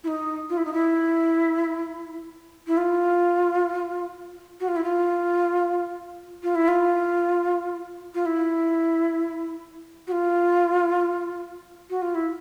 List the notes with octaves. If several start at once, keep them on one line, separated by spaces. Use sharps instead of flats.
E4
D#4
F4
E4
D#4
E4
E4
F4
F#4
F4
E4
F4
F4
E4
F4
F4
E4
F#4
F4
F#4
F4
E4